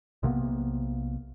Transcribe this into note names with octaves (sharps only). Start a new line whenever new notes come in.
B1 C3 A#3 B3